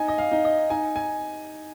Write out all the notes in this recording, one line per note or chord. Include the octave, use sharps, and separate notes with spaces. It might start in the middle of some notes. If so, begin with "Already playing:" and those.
Already playing: D#4 G#5
D#5
F5
D#4
D#5
D#4 G#5
G#5